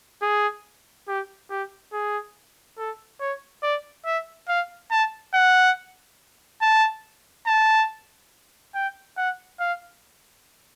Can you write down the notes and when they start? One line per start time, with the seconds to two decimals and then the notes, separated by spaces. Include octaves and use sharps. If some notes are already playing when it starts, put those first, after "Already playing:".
0.22 G#4
1.08 G4
1.50 G4
1.93 G#4
2.78 A4
3.20 C#5
3.63 D5
4.06 E5
4.49 F5
4.91 A5
5.33 F#5
6.62 A5
7.47 A5
8.75 G5
9.17 F#5
9.60 F5